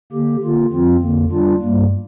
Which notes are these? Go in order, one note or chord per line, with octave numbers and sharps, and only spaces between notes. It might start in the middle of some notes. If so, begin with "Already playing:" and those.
D3 A#3 G4
D3 A#3 F4
F2 F3 C4 F4
F2 D3 A#3
G3 D4 F4
G2 G3 A#3